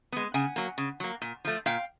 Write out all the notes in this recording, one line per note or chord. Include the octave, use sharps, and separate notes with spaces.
G#3 B3
C#3 F#5 G#5
F#3 A#3
C#3
F#3 A#3
A#2
F3 A3
A#2 F5 G5